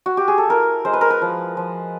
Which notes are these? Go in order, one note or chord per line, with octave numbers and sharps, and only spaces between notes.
F#4
G4
G#4
A4
E4 A#4
G#3 C5
B4
A#4
B4
F3
F3